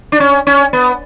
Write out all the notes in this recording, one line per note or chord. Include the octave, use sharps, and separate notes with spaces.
D4
C#4
C#4
B3